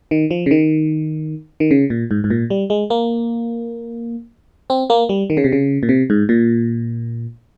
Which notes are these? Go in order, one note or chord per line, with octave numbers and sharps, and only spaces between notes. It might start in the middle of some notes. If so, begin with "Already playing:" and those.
D#3
F3
C#3
D#3
D#3
C#3
A#2
G#2
G#2
A#2
G3
G#3
A#3
C4
A#3
G3
D#3
C#3
C3
C#3
A#2
C3
G#2
A#2